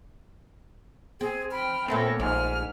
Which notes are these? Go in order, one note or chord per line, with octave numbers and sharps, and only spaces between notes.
C4 G#4
G5 B5 F6
A#2 A3 B3 C4 A4 A#4 C#5
A#1 G#2 C4 G#5 F6